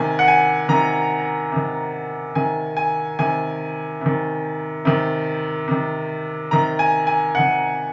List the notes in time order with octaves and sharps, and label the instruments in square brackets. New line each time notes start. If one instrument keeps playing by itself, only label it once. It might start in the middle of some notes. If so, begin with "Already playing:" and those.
Already playing: [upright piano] C3 D#3 G#5
F#5
G#5
C3 D#3 A#5
C3 D#3
C3 D#3 G#5
G#5
C3 D#3 G#5
C3 D#3
C3 D#3
C3 D#3
C3 D#3 A#5
G#5
G#5
C3 D#3 F#5